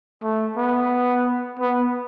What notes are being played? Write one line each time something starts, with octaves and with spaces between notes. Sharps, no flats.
A3
B3
B3